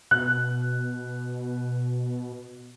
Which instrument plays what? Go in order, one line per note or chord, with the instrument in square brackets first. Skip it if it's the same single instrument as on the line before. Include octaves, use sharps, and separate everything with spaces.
[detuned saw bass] B2 [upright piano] F#6